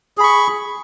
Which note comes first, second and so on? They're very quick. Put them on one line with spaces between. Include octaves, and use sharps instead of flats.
G#4 B5 C#6